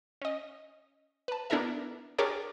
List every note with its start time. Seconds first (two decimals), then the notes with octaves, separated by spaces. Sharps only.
0.22 C#4 D#5
1.28 B4 A5
1.50 B3 D4 E4 A4 A#4 E5
2.18 D4 G4 G#4 A#4 C#5 D5